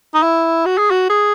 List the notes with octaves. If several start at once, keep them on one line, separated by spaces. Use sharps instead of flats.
D#4
E4
F#4
G#4
F#4
G#4